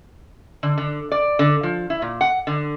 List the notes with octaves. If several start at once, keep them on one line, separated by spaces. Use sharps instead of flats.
D3
D3
D5
D3
F3
E4
A#2
F#5
D3